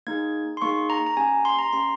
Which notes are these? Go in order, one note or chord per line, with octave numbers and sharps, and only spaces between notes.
A#3 D#4 G#4 G#6
C6
A#3 D#4 G#4 C#6
A#5
A#5
A#3 C#4 G4 G#5
C6
A#5
A#3 C#4 G4 C6